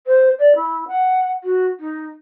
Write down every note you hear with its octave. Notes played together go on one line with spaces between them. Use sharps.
C5
D5
E4
F#5
F#4
D#4